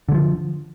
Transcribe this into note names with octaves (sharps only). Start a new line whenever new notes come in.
D3 F3 G#3